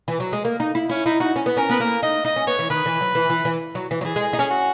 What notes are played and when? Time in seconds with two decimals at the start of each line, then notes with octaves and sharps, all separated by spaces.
0.08 E3
0.20 F#3
0.33 G#3
0.45 A#3
0.60 D#4
0.75 E4
0.90 C#4 E4
1.06 D#4 E4
1.20 D#4 F#4
1.36 C#4
1.46 B3
1.57 C#4 A#4
1.69 B3 B4
1.80 A#3 A#4
2.03 D#4 D#5
2.25 D#4 D#5
2.36 C#4
2.47 B3 C#5
2.59 E3
2.70 D#3 B4
2.86 E3
3.01 F#3
3.15 E3
3.30 E3
3.45 E3
3.75 F#3
3.91 E3
4.01 F#3
4.05 E3 G#4
4.16 G#3
4.33 D#4
4.39 C#4
4.50 F#4